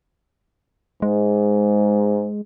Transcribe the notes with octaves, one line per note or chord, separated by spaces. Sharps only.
G#2 G#3